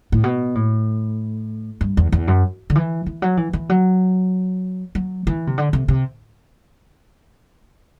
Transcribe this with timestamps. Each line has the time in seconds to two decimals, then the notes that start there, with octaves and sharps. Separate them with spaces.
0.12 A2
0.24 B2
0.55 A2
1.81 G2
1.97 E2
2.12 E2
2.27 F#2
2.70 D3
2.75 E3
3.06 E3
3.22 F#3
3.37 E3
3.53 E3
3.69 F#3
4.95 F#3
5.27 E3
5.47 C3
5.58 D3
5.73 C3
5.88 C3